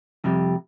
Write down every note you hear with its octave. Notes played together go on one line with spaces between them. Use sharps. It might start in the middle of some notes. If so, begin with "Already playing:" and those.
F2 C3 G3